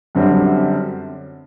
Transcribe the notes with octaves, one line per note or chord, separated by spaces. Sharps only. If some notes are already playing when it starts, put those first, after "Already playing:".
F#2 D3 G3 C4